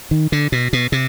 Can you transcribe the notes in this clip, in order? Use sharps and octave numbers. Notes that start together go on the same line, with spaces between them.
D#3
D3
B2
B2
C3